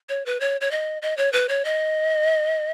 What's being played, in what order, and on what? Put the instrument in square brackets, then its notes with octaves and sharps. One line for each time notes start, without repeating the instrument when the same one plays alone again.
[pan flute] C#5
B4
C#5
C#5
D#5
D#5
C#5
B4
C#5
D#5